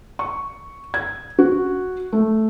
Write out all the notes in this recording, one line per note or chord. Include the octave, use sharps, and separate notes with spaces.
C#6
G#6
F#4
A3